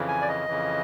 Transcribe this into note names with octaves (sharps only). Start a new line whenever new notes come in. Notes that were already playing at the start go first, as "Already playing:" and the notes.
Already playing: F2 C#3 E3
G#5
D5
D#5
F2 C#3 E3